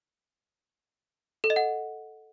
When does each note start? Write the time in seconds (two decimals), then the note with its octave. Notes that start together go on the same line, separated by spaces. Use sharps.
1.44 A4
1.50 D#5
1.56 F#5